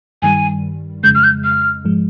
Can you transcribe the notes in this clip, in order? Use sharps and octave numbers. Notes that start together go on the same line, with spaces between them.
G2 D#3 G3 G#5
F2 C#3 G#3 G6
F6
G6
F6
G#2 F3 G#3